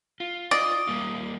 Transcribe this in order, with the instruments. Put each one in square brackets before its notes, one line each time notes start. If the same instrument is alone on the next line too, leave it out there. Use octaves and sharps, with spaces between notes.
[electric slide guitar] F4
[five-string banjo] D5 [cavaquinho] D#5
[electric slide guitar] G3 A#3 F4